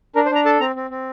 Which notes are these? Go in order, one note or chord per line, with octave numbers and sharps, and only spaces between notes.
D4 A#4
C5
D4 A#5
A4 A5
C4 A#5
C4
C4